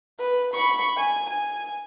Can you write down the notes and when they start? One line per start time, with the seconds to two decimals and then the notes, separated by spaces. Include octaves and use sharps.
0.19 B4
0.53 B5 C#6
0.97 G#5
1.30 G#5